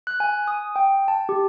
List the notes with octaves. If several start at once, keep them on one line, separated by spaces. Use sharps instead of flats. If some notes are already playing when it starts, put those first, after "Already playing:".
F#6
G#5
D#6
G5
A5
G4